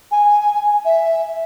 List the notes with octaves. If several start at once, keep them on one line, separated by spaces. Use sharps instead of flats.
G#5
E5